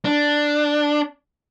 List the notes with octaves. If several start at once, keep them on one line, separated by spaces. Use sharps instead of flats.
D4